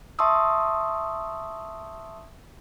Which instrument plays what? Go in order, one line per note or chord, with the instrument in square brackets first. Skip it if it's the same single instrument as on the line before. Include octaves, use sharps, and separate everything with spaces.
[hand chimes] E5 A5 C6 C#6 D#6 E6